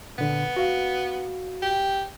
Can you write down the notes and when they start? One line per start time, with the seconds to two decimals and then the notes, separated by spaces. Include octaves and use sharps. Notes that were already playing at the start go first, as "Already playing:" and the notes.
0.18 A#2 D3 B3
0.57 F#4 F5
1.62 G4